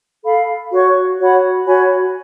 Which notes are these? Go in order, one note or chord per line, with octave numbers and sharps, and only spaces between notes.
A4 F5 B5
F#4 C#5 F#5 C#6
F#4 C#5 F#5 B5
F#4 C#5 G#5 B5